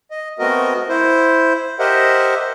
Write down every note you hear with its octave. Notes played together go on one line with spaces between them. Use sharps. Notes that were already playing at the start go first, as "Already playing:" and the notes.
D#5
A3 B3 C4 F#4 A#4 D#5
E4 C5
G4 A#4 C5 D#5 E5 F#5